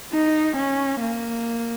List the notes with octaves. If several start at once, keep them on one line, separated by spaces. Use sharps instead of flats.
D#4
C#4
A#3